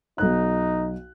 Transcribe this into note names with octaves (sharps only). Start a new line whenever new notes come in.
B1 D#4 F#6